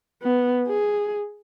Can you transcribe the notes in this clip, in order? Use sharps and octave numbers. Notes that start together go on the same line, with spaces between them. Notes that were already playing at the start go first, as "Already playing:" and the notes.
B3
G#4